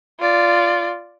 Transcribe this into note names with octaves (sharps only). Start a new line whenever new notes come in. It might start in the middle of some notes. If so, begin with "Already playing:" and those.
F4 D5